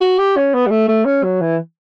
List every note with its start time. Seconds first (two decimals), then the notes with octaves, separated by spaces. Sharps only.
0.01 F#4
0.19 G4
0.37 C#4
0.54 B3
0.66 G3
0.71 A3
0.89 A3
1.05 C#4
1.24 F#3
1.41 E3